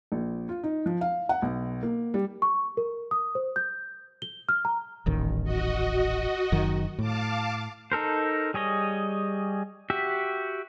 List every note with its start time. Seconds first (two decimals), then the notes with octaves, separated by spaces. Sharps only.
0.12 A#1
0.49 F4
0.64 D#4
0.86 F3
1.01 F5
1.29 F#5
1.42 B1
1.83 A#3
2.14 G3
2.42 C#6
2.77 A#4
3.11 D#6
3.35 C5
3.56 G6
4.22 G7
4.49 F6
4.65 A#5
5.06 D#1 A1 D#3
5.44 F#4 D#5
6.52 F#1 F#2 D#3
6.99 A2 F5 A5 D6
7.92 D#4 A4 A#4 C5
8.54 G3 G#4 C#5 D#5
9.90 F#4 G4 E5